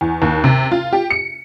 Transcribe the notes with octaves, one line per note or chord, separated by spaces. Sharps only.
E2
D#2
C3
F4
G4
C#7